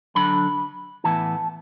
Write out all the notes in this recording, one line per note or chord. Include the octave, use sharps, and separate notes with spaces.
D3 F#3 D4 B5
A2 E3 B3 E4 A5